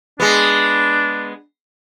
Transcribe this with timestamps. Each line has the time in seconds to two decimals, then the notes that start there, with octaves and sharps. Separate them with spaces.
0.20 G#3 B3 D4